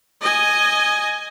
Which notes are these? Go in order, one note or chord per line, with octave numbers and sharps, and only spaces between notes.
D#5 G#5